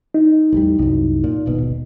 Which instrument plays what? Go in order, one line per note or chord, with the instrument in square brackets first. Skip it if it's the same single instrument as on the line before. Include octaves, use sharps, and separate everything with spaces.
[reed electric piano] D#4
[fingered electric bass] A1 E2 G3
C2 F#2
A#2
D#1 G#1 B2